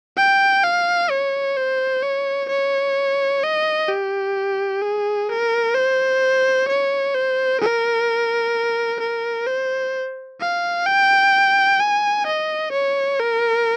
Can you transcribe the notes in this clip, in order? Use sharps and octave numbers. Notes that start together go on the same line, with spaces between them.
G5
F5
C#5
C5
C#5
C#5
D#5
G4
G#4
A#4
C5
C#5
C5
A#4
A#4
C5
F5
G5
G#5
D#5
C#5
A#4